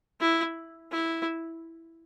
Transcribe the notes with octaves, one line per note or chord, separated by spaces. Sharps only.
E4
E4